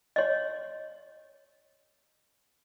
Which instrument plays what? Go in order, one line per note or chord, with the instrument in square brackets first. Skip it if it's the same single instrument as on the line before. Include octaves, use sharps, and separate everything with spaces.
[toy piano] C#5 D#5